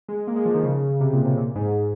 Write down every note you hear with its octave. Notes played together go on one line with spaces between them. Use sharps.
G#3
A#3
G#3
F3
D#3
C#3
C3
A#2
C3
A#2
G#2